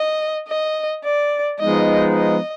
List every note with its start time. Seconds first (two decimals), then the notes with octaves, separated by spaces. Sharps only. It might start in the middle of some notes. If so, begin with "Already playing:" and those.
Already playing: D#5
0.48 D#5
1.04 D5
1.59 F3 G#3 B3 D#4 D#5
2.15 D#5